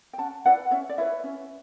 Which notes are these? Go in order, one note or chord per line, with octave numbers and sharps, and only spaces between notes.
G5
C#4 F#5 A5
E4 B4 D5 F#5
C#4 C#5 E5
D5
E4 B4 C#5 E5
C#4